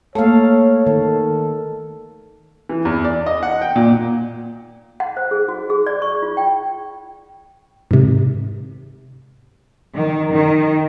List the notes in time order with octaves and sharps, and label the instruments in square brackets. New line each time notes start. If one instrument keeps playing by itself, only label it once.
[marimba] A3 A#3 [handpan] A4 F5 [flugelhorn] C#5
[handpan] D#3 [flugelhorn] A4
[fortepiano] E3
E2
D5
D#5
F#5
G5
A#2
[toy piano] F#5
C5
G#4
F#4
G#4
D5
C#6
F4
G5
[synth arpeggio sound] G#2 C3
[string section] D#3
D#3